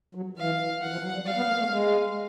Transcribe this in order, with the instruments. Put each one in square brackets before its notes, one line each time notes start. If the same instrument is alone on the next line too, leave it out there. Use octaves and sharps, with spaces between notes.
[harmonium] F#3
[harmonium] E3 [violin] F5
[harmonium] E3 [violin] F#5
[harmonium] F3
F#3
G3
[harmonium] G3 [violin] F5
[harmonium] B3
A#3
A3
G#3